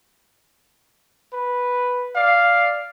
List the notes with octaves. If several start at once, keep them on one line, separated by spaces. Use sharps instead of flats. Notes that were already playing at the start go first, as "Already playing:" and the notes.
B4
D5 F5